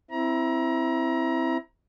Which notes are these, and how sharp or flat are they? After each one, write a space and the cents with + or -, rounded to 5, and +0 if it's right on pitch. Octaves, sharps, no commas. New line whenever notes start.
C4 +0 E4 +0 A#5 +30